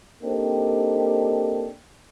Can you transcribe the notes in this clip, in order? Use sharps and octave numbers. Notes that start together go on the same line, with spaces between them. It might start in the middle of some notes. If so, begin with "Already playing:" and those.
A#3 C4 D4 D#4 G4 A4